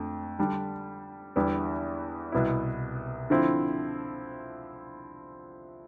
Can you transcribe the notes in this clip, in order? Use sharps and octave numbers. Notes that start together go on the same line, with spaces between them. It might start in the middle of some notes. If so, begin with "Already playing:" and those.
Already playing: F2 D3 A3
D3 G3 D4
E2 D3 G3 B3 E4
C2 B2 B3 E4
D3 F3 C4 E4